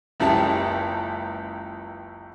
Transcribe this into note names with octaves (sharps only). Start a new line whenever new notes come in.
F#1 C#2 E4 G4 A5